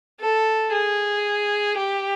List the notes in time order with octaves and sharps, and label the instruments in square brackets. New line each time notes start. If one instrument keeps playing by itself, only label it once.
[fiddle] A4
G#4
G4